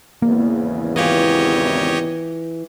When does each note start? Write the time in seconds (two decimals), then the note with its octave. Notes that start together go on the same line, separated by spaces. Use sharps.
0.22 G#1 E2 C#3 A#3
0.96 E3 F4 G4 C#5 D#5